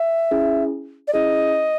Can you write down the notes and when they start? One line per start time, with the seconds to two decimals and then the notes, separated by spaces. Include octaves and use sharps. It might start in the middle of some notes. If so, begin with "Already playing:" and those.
Already playing: E5
0.31 C#4 E4 G#4
1.08 D5
1.13 C#4 E4 G#4 D#5